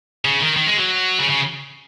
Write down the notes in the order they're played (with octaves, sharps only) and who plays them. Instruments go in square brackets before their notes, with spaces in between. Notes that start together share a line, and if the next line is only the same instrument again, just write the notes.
[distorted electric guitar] C#3
D#3
D#3
G#3
F#3
C#3
C#3